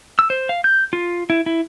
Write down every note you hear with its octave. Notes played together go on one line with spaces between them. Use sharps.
E6
C5
F5
G6
F4
E4
E4